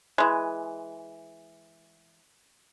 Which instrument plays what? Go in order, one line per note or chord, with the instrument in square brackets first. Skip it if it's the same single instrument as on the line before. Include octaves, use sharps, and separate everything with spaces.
[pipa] E3 G#3